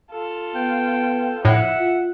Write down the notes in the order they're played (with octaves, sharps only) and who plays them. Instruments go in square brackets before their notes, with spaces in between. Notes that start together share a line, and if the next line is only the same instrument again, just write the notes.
[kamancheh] F4 A4
[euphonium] B3 [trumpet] G5
[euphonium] F2 [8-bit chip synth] A2 [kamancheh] E5 [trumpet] F#5
[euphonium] F4